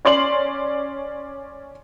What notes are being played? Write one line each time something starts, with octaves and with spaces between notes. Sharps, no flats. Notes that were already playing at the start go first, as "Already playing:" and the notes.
C#4 D5 C6 F#7